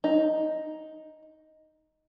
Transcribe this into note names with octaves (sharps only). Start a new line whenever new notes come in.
D#4